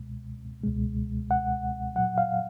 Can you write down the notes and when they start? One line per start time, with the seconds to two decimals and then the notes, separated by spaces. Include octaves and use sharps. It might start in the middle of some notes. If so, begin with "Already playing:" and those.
Already playing: C#2 B2 G#3
0.64 C#2 B2 G#3
1.31 F#5
1.96 A#2 F#3 F#5
2.18 F5